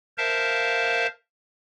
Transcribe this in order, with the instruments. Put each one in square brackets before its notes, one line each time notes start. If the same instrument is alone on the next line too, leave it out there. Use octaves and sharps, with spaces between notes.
[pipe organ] A#4 C5 E5 F5 A5